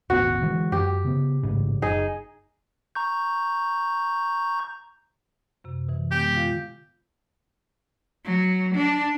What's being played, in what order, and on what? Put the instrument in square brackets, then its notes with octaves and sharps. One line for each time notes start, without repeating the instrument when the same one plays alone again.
[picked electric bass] D#1 G#1 B3 [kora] F#4
[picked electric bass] D3 E3 G#3
[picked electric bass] F#2 [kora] G4
[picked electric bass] C#3 B3
A1 G#2 C#3
[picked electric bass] F#1 [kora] D#4 G#4
[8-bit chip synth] A#5 C#6 G6
[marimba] F#2 C3
B2 E3
[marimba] G#3 B3 [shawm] G4
[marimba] D3 F4 F5
[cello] F#3
D4